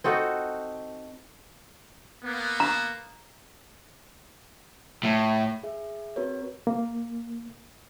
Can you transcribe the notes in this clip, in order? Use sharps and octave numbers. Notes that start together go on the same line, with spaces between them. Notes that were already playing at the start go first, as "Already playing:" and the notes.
C4 D#4 F#4 A4
A#3 B3
A#5
A2
G#4 E5
C4 F#4 A#4 B4 C#5
A#3